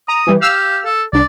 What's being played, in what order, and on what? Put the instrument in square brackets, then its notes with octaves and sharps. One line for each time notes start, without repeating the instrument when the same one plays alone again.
[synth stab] A#5 [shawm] D#6
[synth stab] E3 G3
[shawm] G4 [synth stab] F5 E6 F6
[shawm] A4
[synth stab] C2 D4 [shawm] D5